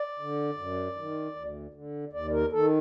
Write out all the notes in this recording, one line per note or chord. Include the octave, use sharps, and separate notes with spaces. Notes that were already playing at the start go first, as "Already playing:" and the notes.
Already playing: D5
D3
F#2
D#3
D2
D3
D#2 D5
A#4
D#3 A4